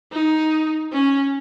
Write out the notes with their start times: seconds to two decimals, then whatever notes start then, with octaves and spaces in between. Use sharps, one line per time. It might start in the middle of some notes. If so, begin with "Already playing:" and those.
0.12 D#4
0.93 C#4